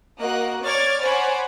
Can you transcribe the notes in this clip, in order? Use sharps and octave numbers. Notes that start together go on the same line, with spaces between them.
A#3 F#4 D#5 F#6
C#5 D5 C#6 F6 G#6 A6
C5 C#5 F#5 G#5 B5 D6